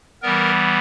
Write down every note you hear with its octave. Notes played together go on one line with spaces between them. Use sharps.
E3 G3 B3 A#4